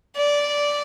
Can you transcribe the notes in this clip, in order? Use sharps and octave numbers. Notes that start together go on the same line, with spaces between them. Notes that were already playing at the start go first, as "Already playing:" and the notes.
D5